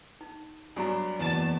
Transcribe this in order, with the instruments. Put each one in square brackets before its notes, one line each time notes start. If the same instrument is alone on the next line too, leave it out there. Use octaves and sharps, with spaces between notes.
[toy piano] D#4
[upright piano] G2 F#3 D4 [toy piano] G#5 A#5
[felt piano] F#1 E2 [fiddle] A5